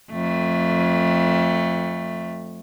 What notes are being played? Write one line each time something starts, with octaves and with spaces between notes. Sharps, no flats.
F2 A3